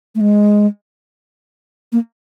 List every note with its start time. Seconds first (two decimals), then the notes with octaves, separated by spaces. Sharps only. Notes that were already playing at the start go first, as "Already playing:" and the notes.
0.15 A3
0.21 G#3
1.92 A#3